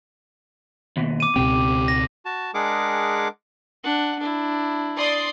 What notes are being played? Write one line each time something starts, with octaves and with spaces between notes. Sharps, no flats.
D#2 B2
D6 D#7
C#2 B2 C4 G4
A#6
F#4 A5
G#3 D4 G#4 A#4 F#5 D6
D4 F#5
D4 E4
D5 C6 D#6